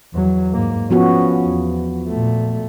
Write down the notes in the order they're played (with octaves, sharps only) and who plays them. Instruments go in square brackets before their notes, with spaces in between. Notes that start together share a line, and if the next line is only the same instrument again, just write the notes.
[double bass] E2 F#3
G#2 A#3
[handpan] F3 B3 F#4 [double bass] C#4
[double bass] E2
A#2 A3